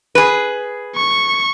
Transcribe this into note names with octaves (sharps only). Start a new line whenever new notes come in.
G#4 B4
C#6